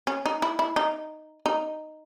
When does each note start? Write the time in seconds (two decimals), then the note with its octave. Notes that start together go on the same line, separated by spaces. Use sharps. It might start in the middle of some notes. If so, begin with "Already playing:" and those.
0.07 C#4
0.26 D#4
0.42 E4
0.59 E4
0.76 D#4
1.46 D#4